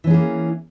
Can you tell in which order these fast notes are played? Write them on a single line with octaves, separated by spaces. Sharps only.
E3 C#4 G#4 A#3